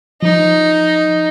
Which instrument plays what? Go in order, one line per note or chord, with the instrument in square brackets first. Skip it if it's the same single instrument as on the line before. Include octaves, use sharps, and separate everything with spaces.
[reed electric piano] F3 [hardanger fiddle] D#4